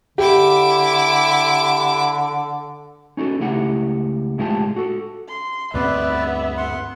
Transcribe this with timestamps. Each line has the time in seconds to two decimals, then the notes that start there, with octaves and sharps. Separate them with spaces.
0.18 D3 E4 G4 D6
3.17 C#4 D#4 F#4 A4
3.40 C#2 A3 E4 G4 F#5
4.38 A2 G#3 E4 F4 G4 A5
4.76 F#4 A4
5.29 C6
5.74 D2 G2 B3 C4 B4 D5 E5
6.57 F#5 C6